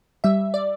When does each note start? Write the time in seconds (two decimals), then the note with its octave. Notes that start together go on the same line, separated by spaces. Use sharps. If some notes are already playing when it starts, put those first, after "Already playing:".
0.24 G3 E5
0.54 D5